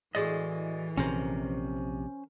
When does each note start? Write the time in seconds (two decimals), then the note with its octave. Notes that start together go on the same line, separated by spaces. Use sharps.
0.15 A2 E3 G#3 F#4 D5 D#5
0.97 A#1 C3 C#4 A#4 C5 A#5 C6